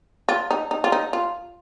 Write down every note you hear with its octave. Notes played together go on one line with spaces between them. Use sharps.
F4
D#4
D#4
F4
D#4
F4